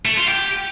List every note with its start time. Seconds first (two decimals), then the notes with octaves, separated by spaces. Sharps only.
0.05 A3
0.17 F4
0.29 G4